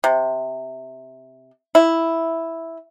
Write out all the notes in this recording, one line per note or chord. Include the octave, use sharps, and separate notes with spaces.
C3
E4